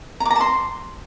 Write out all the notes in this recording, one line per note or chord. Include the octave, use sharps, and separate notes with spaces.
A#5
D6
A#5
A5
C6